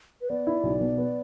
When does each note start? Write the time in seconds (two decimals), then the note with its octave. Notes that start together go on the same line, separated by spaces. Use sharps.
0.21 B4
0.30 B3 D5
0.47 E4
0.63 B1
0.80 B2
0.97 B3